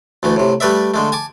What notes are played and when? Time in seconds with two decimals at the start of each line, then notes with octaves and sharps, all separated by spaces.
0.23 D2 E3 A3
0.36 A2 C3
0.60 G3 A3 B4 D5 E5
0.94 D3 G#3 A3
1.12 G#5 A5 D6